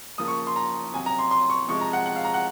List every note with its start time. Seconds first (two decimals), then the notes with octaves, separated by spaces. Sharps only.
0.18 C#3 F3 A#3 D#6
0.28 C#6
0.47 C6
0.56 A#5
0.93 C3 F#3 C#4 G#5
1.06 A#5
1.19 C6
1.31 C6
1.50 C#6
1.68 C3 F3 G#3 C#6
1.81 A#5
1.93 F#5
2.06 F#5
2.16 F5
2.25 A#5
2.34 F#5